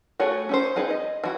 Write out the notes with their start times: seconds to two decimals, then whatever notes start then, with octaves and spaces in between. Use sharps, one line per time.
0.20 A3 F#4 G#4 C#5
0.49 C#4 D#4 C5
0.76 C4 D#4 G#4 B4
0.91 D#5
1.24 E3 F#4